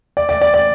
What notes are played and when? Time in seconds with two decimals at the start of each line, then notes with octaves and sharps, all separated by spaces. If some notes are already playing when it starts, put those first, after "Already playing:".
0.17 D5
0.29 D5
0.41 D5
0.54 D5